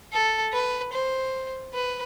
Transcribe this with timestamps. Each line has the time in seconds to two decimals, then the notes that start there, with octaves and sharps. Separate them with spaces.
0.13 A4
0.53 B4
0.93 C5
1.74 B4